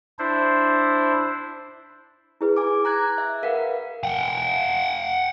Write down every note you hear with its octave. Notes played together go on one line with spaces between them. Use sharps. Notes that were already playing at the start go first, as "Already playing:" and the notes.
D4 E4 C5
E4 G#4 B4
G#5 D6
A#5 F#6 G#6
E5
A#4 B4 F5 F#5
F#5 G5